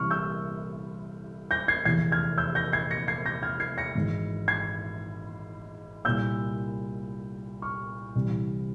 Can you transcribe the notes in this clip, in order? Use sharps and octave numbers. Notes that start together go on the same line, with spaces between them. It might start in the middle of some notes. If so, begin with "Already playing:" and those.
Already playing: C2 C3 E3 C#6 F6
E6 G6
G6 A#6
G#6 C7
F1 E2 E3 G#6 C7
F6 G#6
E6 G6
G6 A#6
G#6 C7
A#6 C#7
G#6 C7
G6 A#6
F6 G#6
G#6 C7
A#6 C#7
G#1 G#2 E3
G#6 C7
C2 A#2 E6 G6
C#6 F6
C2 C3 E3